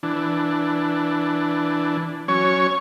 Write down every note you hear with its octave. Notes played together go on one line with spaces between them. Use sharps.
E3 D4
F#3 C#4 C#5 C#6